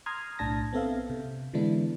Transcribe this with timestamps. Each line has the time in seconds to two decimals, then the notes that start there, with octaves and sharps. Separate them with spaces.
0.06 A#5 C6 D#6 F6 G#6
0.39 B1 A2 D4 A5 A#6
0.73 B3 C4 A4 E5 F5
1.10 C3
1.54 D3 E3 G#3 B3 D4 E4